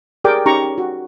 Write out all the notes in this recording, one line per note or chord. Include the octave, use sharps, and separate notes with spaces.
G4 G#4 A#4 D5 G5 D6
C#4 D#4 G4 A#5 C#6
F#4